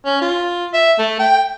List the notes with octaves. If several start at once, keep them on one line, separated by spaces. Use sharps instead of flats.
C#4
F4
E5
A3
G5